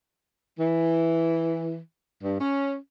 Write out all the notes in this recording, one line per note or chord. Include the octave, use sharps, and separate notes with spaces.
E3
G2
C#4